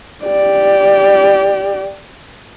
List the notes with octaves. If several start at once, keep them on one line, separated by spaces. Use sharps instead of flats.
G4 D5